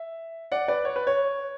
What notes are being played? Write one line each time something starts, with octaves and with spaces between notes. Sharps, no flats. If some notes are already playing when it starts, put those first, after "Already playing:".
Already playing: E5
D5 F#5
B4 D5
C#5
B4
C#5